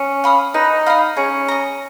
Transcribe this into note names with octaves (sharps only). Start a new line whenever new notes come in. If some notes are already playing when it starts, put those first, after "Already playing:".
Already playing: C#4
F5 B5 D#6
D#4 B4
F5 B5 D#6
C#4 G#4
D#5 A#5